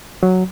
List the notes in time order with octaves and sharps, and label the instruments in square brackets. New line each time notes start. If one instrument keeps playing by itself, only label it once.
[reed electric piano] F#3